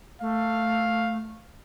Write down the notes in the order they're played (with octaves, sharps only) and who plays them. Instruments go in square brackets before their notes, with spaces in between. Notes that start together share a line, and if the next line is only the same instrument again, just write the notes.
[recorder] A3 [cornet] F5